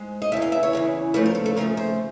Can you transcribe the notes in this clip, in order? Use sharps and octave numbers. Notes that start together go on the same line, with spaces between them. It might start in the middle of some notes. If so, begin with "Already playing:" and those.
Already playing: G#2 G#3
D#5
E2 C#3 E3 E5
F5
E5
C#5
E2 C#3 E3
D#2 C#3 F3 A3 B4
A#4
A4
A4
D#2 C#3 F3 A3 A#4
C5